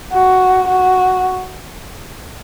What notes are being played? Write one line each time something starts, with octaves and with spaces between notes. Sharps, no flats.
F#4
F#4